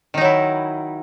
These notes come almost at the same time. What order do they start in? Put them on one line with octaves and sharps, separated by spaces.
D#3 D#4 F#3 E4